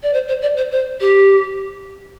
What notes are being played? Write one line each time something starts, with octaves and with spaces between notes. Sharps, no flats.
D5
C5
C5
D5
C5
C5
G4